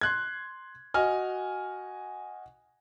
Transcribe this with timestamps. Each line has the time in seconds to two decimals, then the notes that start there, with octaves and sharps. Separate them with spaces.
0.01 C6 F#6 G#6
0.94 F#4 D#5 G#5 F6